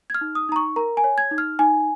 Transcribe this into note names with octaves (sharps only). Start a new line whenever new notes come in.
G#6
F6
D#4
D#6
D#4 A#5
C#6
A#4 A#5
G#5
C#5
G#6
D#4
F6
D#4 G#5